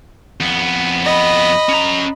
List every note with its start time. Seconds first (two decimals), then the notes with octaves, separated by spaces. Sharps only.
0.41 F2 B3
1.05 D#5 B5
1.69 C#4 A#5